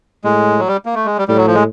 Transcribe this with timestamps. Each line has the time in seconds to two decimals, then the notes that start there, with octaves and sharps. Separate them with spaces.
0.24 A2 G#3
0.59 F#3
0.68 G3
0.86 A#3
0.94 A3
1.05 G#3
1.18 G3
1.28 A2 G3
1.37 F#3
1.47 F3
1.55 G#3